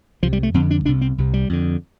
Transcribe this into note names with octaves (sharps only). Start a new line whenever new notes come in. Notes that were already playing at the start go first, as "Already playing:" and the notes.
C2 C3 F3
G3
A3
F2 D3 C4
D4
C2 C3 D4
C4
C2 C3
G3
F2 D3